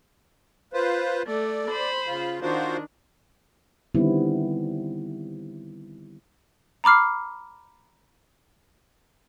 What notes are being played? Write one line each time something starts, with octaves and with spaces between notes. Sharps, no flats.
F4 B4 C5
A3 D5
C5 B5
C#3 F4
D#3 D4 F4 F#4 C5
D3 D#3 G3 B3 C4 E4
A#5 B5 D6 F6 C7